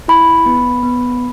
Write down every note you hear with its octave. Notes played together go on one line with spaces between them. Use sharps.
E4 B5
B3
B3